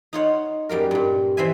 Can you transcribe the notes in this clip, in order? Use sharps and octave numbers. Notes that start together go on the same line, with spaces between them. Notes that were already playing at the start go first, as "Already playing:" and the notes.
D#4 F4 C#5 F#5
F#2 G3 A#3 A#4
G2 A#2
E3 C4 C5 E5 G#5